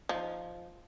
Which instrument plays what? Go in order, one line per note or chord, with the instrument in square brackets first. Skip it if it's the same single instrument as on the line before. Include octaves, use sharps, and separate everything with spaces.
[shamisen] F3 D#4